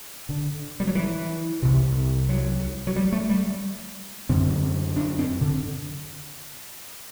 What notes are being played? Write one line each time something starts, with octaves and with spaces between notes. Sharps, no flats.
D3
G3
F#3
E3
C2 C3
F#3
F#3
G3
A3
G3
F#2 D3 C4
D4
C4
D3